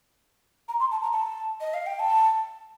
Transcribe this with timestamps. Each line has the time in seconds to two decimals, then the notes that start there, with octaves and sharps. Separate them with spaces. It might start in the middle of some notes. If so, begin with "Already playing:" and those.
0.68 A#5
0.80 C6
0.91 A5
1.02 A#5
1.12 A5
1.61 D#5
1.74 F5
1.86 G5
1.99 A5